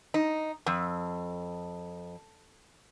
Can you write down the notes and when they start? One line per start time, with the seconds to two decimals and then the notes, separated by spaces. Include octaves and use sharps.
0.14 D#4
0.66 F2